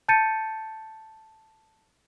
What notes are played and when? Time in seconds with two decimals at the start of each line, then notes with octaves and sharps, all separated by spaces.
0.08 A5 G6 A6 C#7 D#7